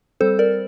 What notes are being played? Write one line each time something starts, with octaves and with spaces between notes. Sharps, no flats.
G3 C4 A4 C5
A#4 D5